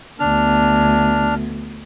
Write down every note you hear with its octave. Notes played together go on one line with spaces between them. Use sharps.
D2 B3 D4 F6